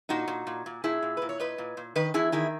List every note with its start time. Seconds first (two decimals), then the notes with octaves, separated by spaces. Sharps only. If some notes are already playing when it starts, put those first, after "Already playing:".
0.09 A#2 D#4 F#4
0.28 A#2
0.47 A#2
0.66 A#2
0.84 A#2 E4 G#4
1.02 A#2
1.17 A#2 B4
1.29 C#5
1.40 A#2 B4 D#5
1.58 A#2
1.77 A#2
1.95 D#3 B4 D#5
2.14 E2 E4 G#4
2.32 D#3 E4 G#4